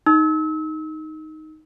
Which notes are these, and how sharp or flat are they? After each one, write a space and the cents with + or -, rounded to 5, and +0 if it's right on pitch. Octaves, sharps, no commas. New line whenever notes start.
D#4 +0 E6 -35